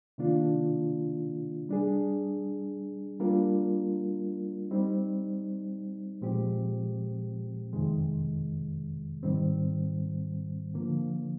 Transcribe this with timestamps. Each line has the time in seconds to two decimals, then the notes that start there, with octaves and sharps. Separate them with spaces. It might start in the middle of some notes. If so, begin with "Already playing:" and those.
0.18 C3 D#3 A#3 D4 F4
1.69 G3 D4 G#4
3.20 G3 A#3 D4 F4 A#4
4.71 G3 C4 D#4
6.21 A#2 F3 G#3 C4 G4
7.73 F2 C3 D#3 G#3
9.23 G#2 D#3 G3 C4
10.74 D3 F3 A#3